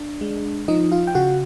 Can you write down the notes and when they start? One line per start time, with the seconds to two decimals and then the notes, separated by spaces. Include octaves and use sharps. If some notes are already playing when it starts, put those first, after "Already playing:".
Already playing: D4
0.21 G#3
0.68 F3 D#4 D#5
0.92 F4 F5
1.07 G5
1.14 C#3 F#4 F#5